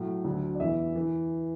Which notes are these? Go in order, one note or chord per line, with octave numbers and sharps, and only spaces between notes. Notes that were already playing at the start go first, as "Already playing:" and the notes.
Already playing: A2 F#3
D2 D3 F#3
D5
E2 E3 E5
E3